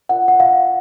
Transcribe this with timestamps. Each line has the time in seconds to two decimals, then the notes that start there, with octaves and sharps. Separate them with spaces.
0.09 F4 A#4 D5 F#5
0.28 F#5
0.40 F5